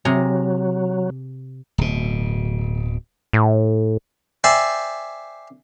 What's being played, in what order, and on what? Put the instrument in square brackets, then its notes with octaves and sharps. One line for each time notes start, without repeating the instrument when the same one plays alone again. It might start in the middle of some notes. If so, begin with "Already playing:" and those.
[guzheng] C3 G#4 A#5 [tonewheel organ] F#3
[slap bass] D1 B2
[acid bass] A2
[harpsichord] C5 D5 E5 G5 G#5